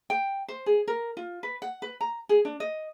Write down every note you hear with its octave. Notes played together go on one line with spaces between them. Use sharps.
G5
C5
G#4
A#4
F4
B4
F#5
B4
A#5
G#4
D4
D#5